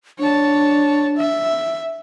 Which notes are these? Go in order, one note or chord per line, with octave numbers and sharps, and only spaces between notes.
D4 C#5 A5
E5